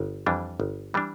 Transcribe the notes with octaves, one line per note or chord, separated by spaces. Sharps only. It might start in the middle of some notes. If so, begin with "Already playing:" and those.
Already playing: G1
F2 E3 G3 D4
G1
E3 G3 D4